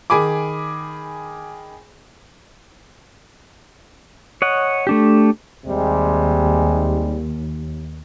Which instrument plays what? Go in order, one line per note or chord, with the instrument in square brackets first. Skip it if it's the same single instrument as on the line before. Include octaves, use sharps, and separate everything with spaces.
[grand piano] D#3 G#4 G#5 B5 D6
[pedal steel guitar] C#5 D#5 F#5
A3 D4 G4
[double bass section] D#2 [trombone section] C3 G3 G#3